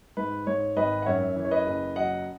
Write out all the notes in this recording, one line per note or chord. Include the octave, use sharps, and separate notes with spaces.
G#2 B4
G#2 C#5
G#1 B4 D#5
F#5
F#2 C#5 E5
E3
C#5
B4 D#5
F#1
F#3 D#5 F#5